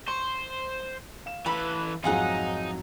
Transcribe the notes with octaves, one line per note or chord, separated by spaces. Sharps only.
C5 C#6
F5 E7
E3 A4 B4 B5
F2 G#2 F#3 D#4 F4 G#4 F#5